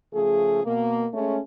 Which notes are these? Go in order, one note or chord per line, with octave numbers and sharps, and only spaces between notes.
C#3 F3 A3 G#4
B2 A#3
G#3 A3 C#4